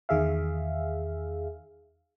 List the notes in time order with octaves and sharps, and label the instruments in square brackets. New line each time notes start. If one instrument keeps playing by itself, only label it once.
[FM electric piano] E2 D#3 G#4 E5 F5